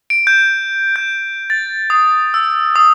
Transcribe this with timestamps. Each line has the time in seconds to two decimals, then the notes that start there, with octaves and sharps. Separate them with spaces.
0.10 D7
0.27 G6
0.96 G6
1.50 A6
1.90 D#6
2.34 E6
2.76 D#6